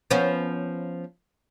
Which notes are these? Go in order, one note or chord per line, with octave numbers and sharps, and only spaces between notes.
F3 B3 C#4